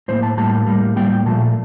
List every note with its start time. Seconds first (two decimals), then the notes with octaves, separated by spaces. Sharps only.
0.08 A2 G3 A#3 C5
0.23 A5
0.37 A2 G3 A#3 A5
0.67 A2 G3 A#3
0.96 A2 G3 A#3 G5
1.26 A#2 F3 A3 A5